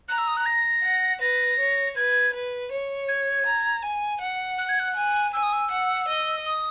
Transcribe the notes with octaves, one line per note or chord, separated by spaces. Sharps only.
A#5 F#6
E6
D#6
F#6
A#6
F#5
B4 A#6
C#5
B4 G#6
B4
C#5
G#6
A#5
G#5
F#5
F#6
G#6
F#6
G#5
G#5 E6
D#6
E6
F#5
D#5
D#6